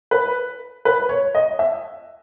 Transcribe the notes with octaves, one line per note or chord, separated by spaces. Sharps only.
B4
B4
C#5
D#5
E5